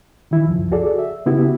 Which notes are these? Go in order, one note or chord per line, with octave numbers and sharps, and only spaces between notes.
D#3 E3 E4
C#2 F#2 F3
F#4 G#4 A4 D5
E5
C#3 B3 E4 F#4 G4